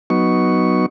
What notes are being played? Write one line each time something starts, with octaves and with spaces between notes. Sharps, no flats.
F#3 B3 D#4 C#6